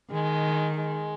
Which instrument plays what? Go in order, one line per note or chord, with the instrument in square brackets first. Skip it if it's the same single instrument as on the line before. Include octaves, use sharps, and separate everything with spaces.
[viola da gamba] D#3 [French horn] G#3
[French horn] G#3